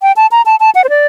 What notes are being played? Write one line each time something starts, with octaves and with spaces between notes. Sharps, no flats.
G5
A5
A#5
A5
A5
F#5
C5
D5